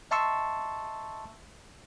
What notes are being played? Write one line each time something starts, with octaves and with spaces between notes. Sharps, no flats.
D#5 E5 A5 C6 C#6 E6